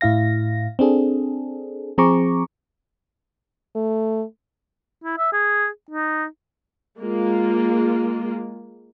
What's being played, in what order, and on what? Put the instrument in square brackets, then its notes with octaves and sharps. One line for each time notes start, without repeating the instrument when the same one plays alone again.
[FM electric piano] A2 E4 F5 A#6
C4 D4 G#4 A4
F3 C4 G#4 A#5 C#6 D6
[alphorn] A3
[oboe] E4
E5
G#4
D#4
[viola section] G#3 A#3 F4